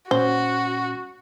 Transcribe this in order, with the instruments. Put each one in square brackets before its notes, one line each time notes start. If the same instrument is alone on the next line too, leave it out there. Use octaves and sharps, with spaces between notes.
[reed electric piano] A#2 C#4 [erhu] F#4 [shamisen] C5